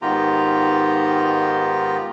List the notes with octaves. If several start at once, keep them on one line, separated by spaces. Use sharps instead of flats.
G#2 D#3 B3 F4 G4 A#5